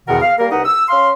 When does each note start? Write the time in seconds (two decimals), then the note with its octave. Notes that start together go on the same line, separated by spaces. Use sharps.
0.07 E2 B2 D#3 A#4 F#5
0.22 F5
0.39 G3 A#3 A#4
0.51 C2 D#4 B4 D#5 F#5
0.65 E6
0.89 C#4 F5 C6